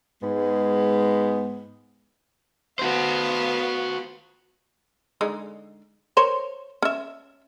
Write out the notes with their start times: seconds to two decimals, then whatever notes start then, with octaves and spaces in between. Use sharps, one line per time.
0.21 G#2 G#3 B3
2.79 B3 F#4 C5 F5
5.21 D3 G#3 D#4
6.17 A#4 C5 C#5
6.82 C#4 E5